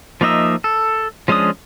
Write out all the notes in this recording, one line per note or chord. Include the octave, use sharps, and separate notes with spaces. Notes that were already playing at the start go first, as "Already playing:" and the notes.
F3 A#3 D#4 D#5 E5
A4
F3 G#3 C#4 D4 D#6